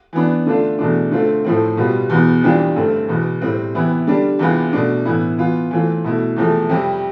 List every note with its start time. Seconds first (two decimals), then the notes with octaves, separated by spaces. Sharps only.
0.13 E3 B3 D4
0.46 D3 A3 D4 F4
0.79 E2 B2 A3 D4
1.11 D3 A3 C4 F4
1.45 A2 F3 A3 C4
1.77 B2 G3 B3 F4
2.10 E2 B2 B3
2.43 F2 E3 G3 D4 F4
2.76 G2 D3 A3 C4
3.08 E2 B2 B3
3.41 A2 G3 C4
3.74 C3 E3 B3 E4
4.07 D3 G3 D4
4.39 E2 C3 E3 B3 F4
4.73 B2 A3 D4
5.05 A2 E3 B3 E4
5.38 E3 B3 F4
5.71 E3 A3 C4 F4
6.04 B2 A3 E4
6.36 E2 C3 F3 A3
6.69 F2 C3 G3